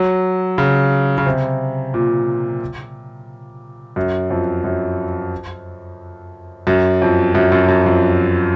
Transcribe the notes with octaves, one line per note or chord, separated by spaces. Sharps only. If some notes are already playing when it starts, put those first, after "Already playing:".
Already playing: F#3
C#3
C#3
C3
A#2
F#2
F2
F#2
F#2
F2
F#2
F#2
F#2
F2